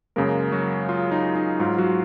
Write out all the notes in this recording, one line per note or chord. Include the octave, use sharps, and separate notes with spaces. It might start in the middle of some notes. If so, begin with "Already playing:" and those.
F#2 C#3 G#3 A#3 A#4
F#3 F#4
F4
D#4
D#4
G#2 F#3 F4
F#3 F#4